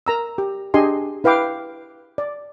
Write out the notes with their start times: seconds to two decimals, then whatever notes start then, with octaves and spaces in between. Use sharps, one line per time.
0.07 A#4 A#5 E6
0.38 G4
0.74 D4 G4 G#4 D#5 G#5 C6
1.24 E4 B4 F5 G5 D6
2.18 D5